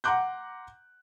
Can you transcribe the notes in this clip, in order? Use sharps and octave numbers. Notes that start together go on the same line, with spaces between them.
F#5 A#5 C6 D6 F#6 G6